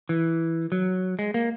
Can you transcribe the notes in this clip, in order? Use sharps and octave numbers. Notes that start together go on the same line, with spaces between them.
E3
F#3
G#3
A#3